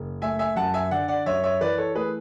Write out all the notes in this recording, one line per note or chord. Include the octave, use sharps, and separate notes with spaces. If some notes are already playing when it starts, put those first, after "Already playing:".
Already playing: F#1
A3 E5 G#5
E5 G#5
F#2 F#5 A5
E5 G#5
D3 D5 F#5
D5 F#5
F#2 C#5 E5
C#5 E5
E3 B4 D5
A4 C#5
A3 G#4 B4